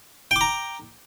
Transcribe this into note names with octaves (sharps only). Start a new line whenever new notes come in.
G5 A#5 D6